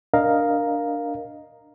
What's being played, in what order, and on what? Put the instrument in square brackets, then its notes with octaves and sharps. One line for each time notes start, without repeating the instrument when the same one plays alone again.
[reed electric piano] D4 A#4 D#5 F5 A#5